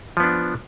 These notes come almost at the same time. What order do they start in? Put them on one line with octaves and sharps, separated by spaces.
F3 B3 D4